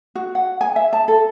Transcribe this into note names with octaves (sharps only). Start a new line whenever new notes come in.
F#4
F#5
G#5
E5
A5
A4